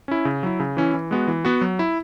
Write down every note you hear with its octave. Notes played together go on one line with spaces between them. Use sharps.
C#4 E4
C#3
F#3 E4
C#3
E3 C#4 E4
E3
G#3 B3 F#4
E3
B3 F#4
F#3
E4